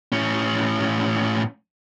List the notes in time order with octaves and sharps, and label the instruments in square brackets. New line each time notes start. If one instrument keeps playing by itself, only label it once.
[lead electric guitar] A2 C#4